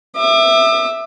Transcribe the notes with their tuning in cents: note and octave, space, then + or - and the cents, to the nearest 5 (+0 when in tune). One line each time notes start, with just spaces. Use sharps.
E5 +0 D6 +40